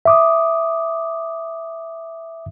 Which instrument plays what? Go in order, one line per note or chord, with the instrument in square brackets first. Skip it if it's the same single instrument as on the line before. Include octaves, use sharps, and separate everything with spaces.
[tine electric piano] E5 D6 D#6